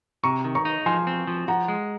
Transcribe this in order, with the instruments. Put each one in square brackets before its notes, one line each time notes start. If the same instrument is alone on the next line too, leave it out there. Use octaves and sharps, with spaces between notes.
[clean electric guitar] C3 [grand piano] A#5 C#6
[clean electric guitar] D#3
[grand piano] A#5 C#6
[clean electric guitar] D#4
[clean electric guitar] F3 [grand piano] G#5 C6
[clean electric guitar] C4
F3
[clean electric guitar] F3 [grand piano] F#5 A#5
[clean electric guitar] G#3